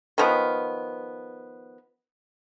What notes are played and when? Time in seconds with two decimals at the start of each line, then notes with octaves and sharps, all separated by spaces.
0.18 D#3 F3 B3